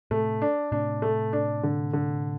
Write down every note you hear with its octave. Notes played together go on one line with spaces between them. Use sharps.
A2 C3 A3
D4
A2 C3 D4
A3
D4
D3
D3